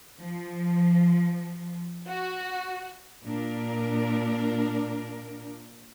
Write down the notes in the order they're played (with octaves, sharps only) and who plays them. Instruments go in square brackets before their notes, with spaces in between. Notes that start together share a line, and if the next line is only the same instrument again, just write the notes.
[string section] F3
F#4
[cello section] A#2 D4 A#4